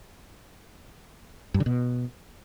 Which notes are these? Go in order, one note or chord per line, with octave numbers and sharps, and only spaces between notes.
G2
D3
B2